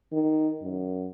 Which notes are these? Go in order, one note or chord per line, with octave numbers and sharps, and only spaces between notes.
D#3
F#2